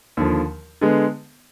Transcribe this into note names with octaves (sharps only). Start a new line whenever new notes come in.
D#2 D3 F3
D3 G#3 B3